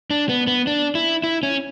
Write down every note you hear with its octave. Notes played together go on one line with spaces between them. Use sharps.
D4
B3
B3
D4
E4
E4
C#4